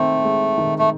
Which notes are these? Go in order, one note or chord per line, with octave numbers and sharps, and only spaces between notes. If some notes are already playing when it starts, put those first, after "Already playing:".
Already playing: D#3 A3 C4
G#3
D#3
A3